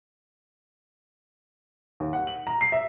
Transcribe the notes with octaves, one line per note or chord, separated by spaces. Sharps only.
D#2
F#5
F#7
A#5
C7
E5